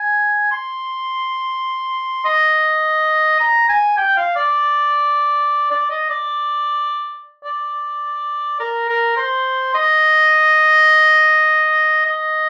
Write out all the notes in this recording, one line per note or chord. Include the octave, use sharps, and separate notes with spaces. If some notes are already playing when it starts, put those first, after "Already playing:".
Already playing: G#5
C6
D#5
A#5
G#5
G5
F5
D5
D5
D#5
D5
D5
A#4
A#4
C5
D#5
D#5